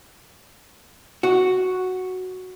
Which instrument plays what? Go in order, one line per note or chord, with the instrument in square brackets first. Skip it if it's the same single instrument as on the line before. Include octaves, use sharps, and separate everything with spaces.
[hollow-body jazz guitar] F#4